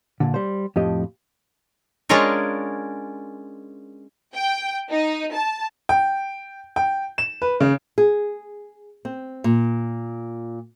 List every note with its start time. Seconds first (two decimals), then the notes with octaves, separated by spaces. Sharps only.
0.20 A#2 D3
0.34 G3 C5
0.76 F2 A2 G4 D#5
2.09 G#3 C#4 D4 F4 A#4 C#5
4.34 G5
4.91 D#4
5.33 A5
5.89 G5
6.76 G5
7.18 E7
7.42 B4
7.60 C#3
7.98 G#4
9.05 C4
9.44 A#2